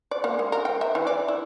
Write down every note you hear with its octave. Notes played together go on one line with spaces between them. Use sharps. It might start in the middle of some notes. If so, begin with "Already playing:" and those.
D5
A#3
G#3
A#4
G5
E5
E3
D5
E4